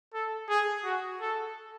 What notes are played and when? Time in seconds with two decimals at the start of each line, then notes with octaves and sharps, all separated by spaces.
0.14 A4
0.49 G#4
0.84 F#4
1.21 A4